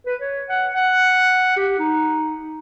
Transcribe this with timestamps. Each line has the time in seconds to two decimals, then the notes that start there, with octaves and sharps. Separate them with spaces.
0.06 B4
0.21 C#5
0.49 F#5
0.74 F#5
1.57 G4
1.79 D#4